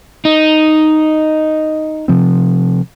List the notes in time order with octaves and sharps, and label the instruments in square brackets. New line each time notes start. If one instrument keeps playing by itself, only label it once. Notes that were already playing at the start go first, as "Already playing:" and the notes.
[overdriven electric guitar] D#4
[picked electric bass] C3 F3 C4